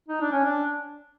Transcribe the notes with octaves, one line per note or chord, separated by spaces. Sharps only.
D#4
D4
C#4
D4